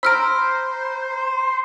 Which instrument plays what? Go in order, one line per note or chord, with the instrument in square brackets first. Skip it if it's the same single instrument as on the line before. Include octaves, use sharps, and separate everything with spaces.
[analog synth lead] C5 [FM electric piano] A#5 B5 [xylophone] E6 F6 D7